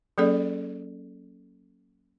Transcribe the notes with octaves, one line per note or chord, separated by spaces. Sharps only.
F#3 A#3 C#4 G#4 A4 D5